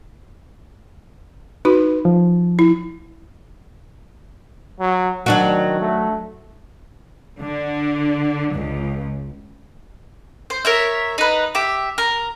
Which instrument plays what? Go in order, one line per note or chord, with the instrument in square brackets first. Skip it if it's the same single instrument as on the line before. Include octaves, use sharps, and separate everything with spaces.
[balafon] D#4 F#4 [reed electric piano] B4
[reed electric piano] F3
[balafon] E4
[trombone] F#3
[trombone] D#3 [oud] F#3 D4 F#4
[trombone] A3
[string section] D3
C#2
[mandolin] C5
A#4 C#5 E5
D#4 B4
G4 E5
A#4